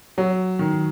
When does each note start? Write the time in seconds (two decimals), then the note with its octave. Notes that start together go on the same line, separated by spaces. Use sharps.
0.18 F#3
0.59 D#3